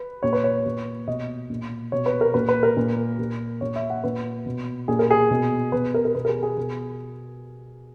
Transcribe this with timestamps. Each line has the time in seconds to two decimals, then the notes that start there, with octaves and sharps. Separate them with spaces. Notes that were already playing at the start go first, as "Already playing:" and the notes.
Already playing: B4
0.23 A#2 C#5
0.33 B4
0.44 C#5
0.66 A#2
1.07 B2 D#5
1.50 A#2
1.92 B2 C#5
2.06 B4
2.21 A#4
2.34 A#2 B4
2.49 B4
2.63 A#4
2.77 A#2
3.19 A#2
3.61 A#2 C#5
3.76 E5
3.90 F#5
4.04 A#2 B4
4.46 B2
4.88 A#2 G#4
4.99 A#4
5.10 G#4
5.31 B2
5.72 B2 B4
5.94 A#4
6.05 A#4
6.15 B2 B4
6.25 A#4
6.29 G#4
6.43 G#4
6.57 B2